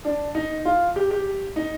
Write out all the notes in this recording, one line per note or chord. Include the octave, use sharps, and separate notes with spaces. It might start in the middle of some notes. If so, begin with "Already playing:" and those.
D4
D#4
F4
G4
G4
D#4